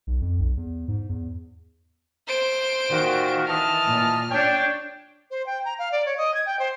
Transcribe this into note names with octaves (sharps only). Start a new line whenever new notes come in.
B1
F2
B1
E2
G#2
E2
C5 D7
A#2 D#3 F4 F#4
E3 D#5 A5 F6
A#2
D4 C#5 G5
C5
G5
A#5
F5
D5
C#5
D#5
G#6
G5
C5